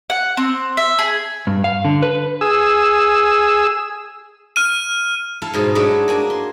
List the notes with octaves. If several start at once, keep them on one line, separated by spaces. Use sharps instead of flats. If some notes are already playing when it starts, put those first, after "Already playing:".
F#5
C4
E5
G#4
G2
F5
D3
B4
G#4 E6
F6 D#7
E4 A4 F5
G#2 B2 D#4
F#3 G#3 A3 B3 D4 E4
A#3 D4 G#5
C6